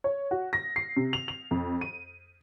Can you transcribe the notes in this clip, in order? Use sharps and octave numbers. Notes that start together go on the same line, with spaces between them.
C#5
F#4
A#6
C7
C3
F7
F7
F2
D#7